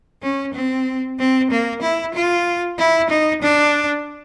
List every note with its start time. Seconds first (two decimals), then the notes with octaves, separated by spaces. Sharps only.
0.23 C#4
0.54 C4
1.19 C4
1.51 A#3
1.82 E4
2.14 F4
2.79 E4
3.10 D#4
3.42 D4